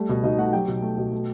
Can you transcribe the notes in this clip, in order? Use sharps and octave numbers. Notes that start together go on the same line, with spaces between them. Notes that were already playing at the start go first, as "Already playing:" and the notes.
Already playing: G3 A3
B2
B2 D#4 D#5
A3 F#4 F#5
F#3 G4 G5
B2
A3
B2
A3